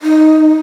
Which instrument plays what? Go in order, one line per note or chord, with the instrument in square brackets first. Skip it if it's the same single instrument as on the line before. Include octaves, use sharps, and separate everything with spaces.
[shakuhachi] D#4